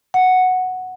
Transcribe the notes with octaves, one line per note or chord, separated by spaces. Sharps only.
F#5